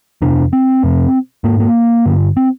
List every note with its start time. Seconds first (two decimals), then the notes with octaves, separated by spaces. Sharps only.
0.22 F2 C3 D4
0.53 C4
0.83 F2 C3
1.44 G#2 A#3
1.60 A#3
2.06 G2 D3
2.37 C4